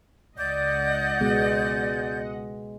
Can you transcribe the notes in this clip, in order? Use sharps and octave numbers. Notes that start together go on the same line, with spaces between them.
C#2 D5 D#5 F#5 G6
B2 G#3 B3